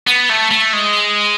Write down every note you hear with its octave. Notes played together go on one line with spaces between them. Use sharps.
B3
A3
A3
G#3